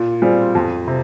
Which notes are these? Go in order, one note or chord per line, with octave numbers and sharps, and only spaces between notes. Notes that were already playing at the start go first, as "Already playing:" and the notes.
Already playing: A#2
G3 C4 F4 G#4
F2
C3